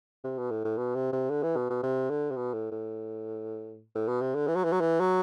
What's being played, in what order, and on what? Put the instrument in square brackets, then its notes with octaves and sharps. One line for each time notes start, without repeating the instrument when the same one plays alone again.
[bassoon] C3
B2
A2
A2
B2
C3
C3
D3
E3
B2
B2
C3
D3
C3
B2
A2
A2
A2
B2
C3
D3
E3
F#3
E3
F#3
E3
F#3